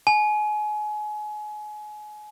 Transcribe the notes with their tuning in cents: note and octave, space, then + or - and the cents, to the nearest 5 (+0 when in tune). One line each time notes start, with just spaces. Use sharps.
G#5 +30